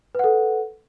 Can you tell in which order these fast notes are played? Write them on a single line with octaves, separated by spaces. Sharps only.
B4 F#5 A4